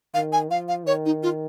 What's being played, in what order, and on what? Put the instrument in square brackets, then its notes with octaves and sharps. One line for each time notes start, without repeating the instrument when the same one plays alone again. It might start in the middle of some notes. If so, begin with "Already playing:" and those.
[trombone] D#3 [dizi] F5
[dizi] G#5
[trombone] F3 [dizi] F5
[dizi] F5
[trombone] D#3 [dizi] C#5
[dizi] D#4
F4